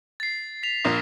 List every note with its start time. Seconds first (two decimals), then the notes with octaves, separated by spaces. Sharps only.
0.20 A6 C7
0.63 B6 F7
0.85 A#1 A#2 A#6